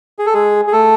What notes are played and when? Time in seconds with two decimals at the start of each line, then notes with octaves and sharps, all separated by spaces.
0.19 G#4
0.26 A4
0.34 G#3 G#4
0.67 G#4
0.72 A3 A4